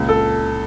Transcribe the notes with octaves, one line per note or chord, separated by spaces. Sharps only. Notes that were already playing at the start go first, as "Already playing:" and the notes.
Already playing: C#2 A#2
A4